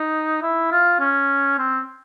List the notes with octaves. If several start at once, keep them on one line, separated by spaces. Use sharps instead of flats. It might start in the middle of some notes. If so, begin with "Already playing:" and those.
Already playing: D#4
E4
F4
C#4
C4